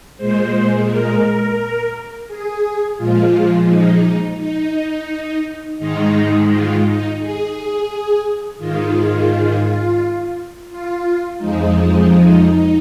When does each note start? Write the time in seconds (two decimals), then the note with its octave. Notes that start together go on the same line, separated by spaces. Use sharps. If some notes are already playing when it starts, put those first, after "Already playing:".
0.17 A#2 G#3 C5
0.87 A#4
2.28 G#4
2.97 A#2 F3 G#3 F4
3.68 D#4
4.38 D#4
5.78 G#2 D#3 G#3 D#4
6.49 F4
6.84 D#4
7.18 G#4
8.59 G#2 D#3 G#3 F4
10.69 F4
11.39 F2 F3 G#3 D#4